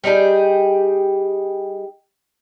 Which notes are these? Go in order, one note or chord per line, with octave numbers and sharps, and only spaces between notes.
G3 D#4 G4 G#4